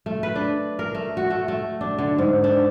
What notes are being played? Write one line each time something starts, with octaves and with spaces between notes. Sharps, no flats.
A3
B4
D4
A#4
A3
F#4
A3
A3
D4
D3
G#2
D4